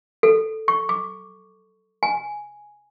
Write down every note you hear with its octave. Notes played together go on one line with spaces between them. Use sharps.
A4
C#6
D6
G#5